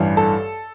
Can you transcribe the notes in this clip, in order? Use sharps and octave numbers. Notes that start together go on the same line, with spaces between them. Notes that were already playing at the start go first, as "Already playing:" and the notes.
Already playing: A1 G2 E3
A4